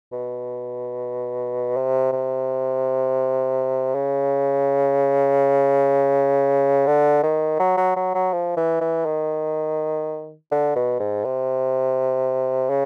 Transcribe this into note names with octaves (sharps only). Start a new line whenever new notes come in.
B2
C3
C3
C#3
D3
D#3
F#3
F#3
F#3
F#3
F3
E3
E3
D#3
D3
B2
G#2
C3
C#3